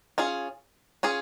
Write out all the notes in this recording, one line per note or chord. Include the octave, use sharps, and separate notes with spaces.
C#4 F4 G#4
C#4 F4 G#4